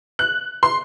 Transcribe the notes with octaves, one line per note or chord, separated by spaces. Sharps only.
F#6
C6